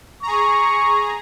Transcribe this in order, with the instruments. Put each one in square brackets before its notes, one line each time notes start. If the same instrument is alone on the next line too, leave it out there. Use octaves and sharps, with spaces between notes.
[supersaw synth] G#4 A#5 [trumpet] C#6